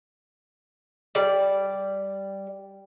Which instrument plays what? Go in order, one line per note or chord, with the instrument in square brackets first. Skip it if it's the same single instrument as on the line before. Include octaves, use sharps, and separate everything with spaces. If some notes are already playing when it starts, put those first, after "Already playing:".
[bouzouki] G3 D5